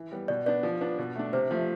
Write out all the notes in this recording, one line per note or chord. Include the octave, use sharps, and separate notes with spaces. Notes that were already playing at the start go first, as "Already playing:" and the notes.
Already playing: E3
G3 B3
B2 D5
B3 D4 D5
F3
B3 D4
B2
A3 D4
C3 C5
F3 A3